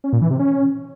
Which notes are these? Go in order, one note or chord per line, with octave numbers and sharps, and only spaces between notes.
C#4
A#2
E3
C3
C#4